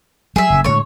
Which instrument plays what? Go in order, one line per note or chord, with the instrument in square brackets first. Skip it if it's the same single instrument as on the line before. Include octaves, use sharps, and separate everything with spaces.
[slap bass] F#3 G3 [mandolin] G#4 E5
[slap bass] F#1 A#2 C#3
[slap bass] A2 D3 G#3 [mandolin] C#5 C#6